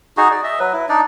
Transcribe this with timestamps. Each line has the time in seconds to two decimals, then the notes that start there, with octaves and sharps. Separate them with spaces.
0.17 D#4 F#4 G#4
0.31 D5
0.43 D#5 E5
0.59 F#3 B4
0.73 E4
0.89 D4 D#4 D5